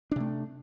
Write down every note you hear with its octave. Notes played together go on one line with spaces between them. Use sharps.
C3 A3 D4